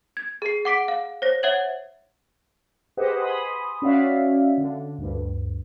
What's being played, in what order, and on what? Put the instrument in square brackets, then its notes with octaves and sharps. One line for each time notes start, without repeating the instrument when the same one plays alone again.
[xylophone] G#6
G#4 C7
F#5 D6 B6 D7
F5
C5 C#5 A#6
C#5 E5 F#5 G#6 F#7
[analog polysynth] G4 G#4 B4 C5 D#5 F#5
G#5 B5 C6 D#6
C#4 F#4 C#5 D5 E5 F5
D3
D2 G2